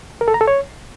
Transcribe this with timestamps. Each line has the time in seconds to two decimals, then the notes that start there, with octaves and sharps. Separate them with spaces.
0.21 A#4
0.28 A4
0.34 A#5
0.41 A4
0.48 C#5